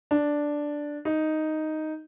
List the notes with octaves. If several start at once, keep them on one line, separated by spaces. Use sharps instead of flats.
D4
D#4